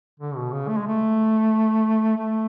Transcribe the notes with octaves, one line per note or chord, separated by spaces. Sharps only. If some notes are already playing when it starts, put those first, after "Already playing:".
D3
B2
C#3
A3
G#3
A3
A3